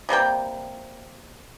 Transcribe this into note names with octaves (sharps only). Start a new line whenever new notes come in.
C3 G3 A#3 G5